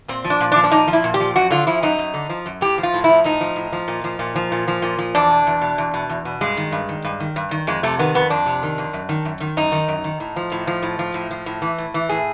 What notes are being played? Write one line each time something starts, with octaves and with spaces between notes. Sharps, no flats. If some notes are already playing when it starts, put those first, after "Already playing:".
A#2 C4
F3
D4
A#2
D4
F3
D4
A#2 D#4
F3
E4
A#2
G4
F3
F#2 F#4
D3 F4
F3 E4
F#2 D#4
F#2
D3
F3
F#2
A2 G4
F3
F4
A2
F3 E4
A2 D#4
F3
A2
F3
A#2
F3
A#2
F3
A#2
F3
A#2
F3
E2 D4
B2
E2
B2
E2
B2
E2
B2
G2 G#3
D#3
G2
D#3
G2
D#3
G2
D#3
F2 G#3
C3 A3
D#3 B3
F2 B3
F2 D4
C3
D#3
F2
F#2
D#3
F#2
D#3
F#2 D#4
D#3
F#2
D#3
A2
F3
A2
F3
A2
F3
A2
F3
A2
E3
A2
E3
A2 G#4